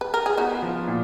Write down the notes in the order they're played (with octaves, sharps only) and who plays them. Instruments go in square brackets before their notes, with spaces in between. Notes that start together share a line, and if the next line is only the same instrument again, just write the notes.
[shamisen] B4
A#4
G#4
[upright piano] B3 [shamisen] D#4 F#4
[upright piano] F3
A#2